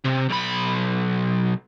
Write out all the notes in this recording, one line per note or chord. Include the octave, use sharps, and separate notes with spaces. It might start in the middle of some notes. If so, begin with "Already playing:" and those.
C3
B1 B5